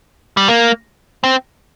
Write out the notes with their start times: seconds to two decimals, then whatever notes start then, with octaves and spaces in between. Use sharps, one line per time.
0.37 G3
0.48 A#3
1.24 C4